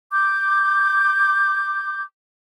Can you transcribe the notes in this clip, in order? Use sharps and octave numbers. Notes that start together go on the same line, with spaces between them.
D6 G6